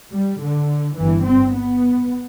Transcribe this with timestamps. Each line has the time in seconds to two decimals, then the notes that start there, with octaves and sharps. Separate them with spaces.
0.13 G3
0.41 D3
0.97 G1 G2 E3
1.25 C4
1.53 B3